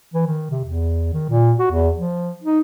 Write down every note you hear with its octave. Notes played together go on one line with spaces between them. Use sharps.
E3
D#3
C3
E2
D#3
A#2
F#4
E2
F3
D#4